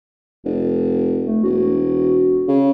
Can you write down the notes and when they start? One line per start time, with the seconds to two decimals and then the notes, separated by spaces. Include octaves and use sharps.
0.45 F1
1.26 A3
1.44 E1 F#4
2.48 C#3